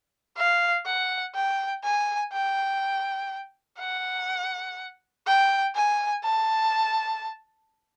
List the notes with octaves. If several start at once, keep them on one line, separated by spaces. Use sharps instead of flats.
F5
F#5
G5
G#5
G5
F#5
G5
G#5
A5